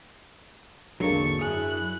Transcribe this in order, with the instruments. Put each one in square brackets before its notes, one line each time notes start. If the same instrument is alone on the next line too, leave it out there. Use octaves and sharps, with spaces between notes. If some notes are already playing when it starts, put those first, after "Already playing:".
[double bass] G#1 E2 [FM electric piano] D3 G#3 A#3 [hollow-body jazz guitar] F#3 D4 [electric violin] C#6
[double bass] F#2 E4 [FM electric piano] G#4 [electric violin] F#6